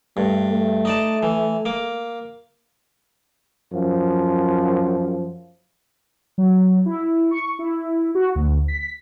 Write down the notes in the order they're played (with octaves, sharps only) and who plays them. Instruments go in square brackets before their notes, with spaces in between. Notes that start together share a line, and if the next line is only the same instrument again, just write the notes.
[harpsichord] G2 [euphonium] A3
[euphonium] A3
[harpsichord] D#4 D5 A5
E3
A#3 D6
[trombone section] F#2 F3
[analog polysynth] F#3
E4
C#6
E4
F#4
D2
B6